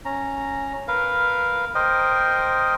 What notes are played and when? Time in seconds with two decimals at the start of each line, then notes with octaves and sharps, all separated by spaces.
0.05 C#4 A#5
0.88 A#4 B4 F5
1.75 A#4 C5 D#5 G5